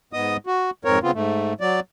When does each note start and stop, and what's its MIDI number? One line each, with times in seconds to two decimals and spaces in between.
0.13 0.37 44
0.13 0.37 59
0.13 0.37 75
0.13 0.37 87
0.47 0.70 66
0.85 0.99 41
0.85 0.99 44
0.85 0.99 60
0.85 0.99 70
0.85 0.99 73
1.03 1.11 49
1.03 1.11 59
1.03 1.11 60
1.03 1.11 65
1.14 1.53 44
1.14 1.53 57
1.61 1.80 54
1.61 1.80 74